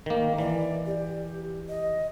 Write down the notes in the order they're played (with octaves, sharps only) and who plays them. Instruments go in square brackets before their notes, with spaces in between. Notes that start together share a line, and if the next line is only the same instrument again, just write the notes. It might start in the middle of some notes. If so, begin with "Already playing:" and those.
[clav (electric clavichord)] D#3 A#3
[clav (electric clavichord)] E3 [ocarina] D5
[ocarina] G4
D#5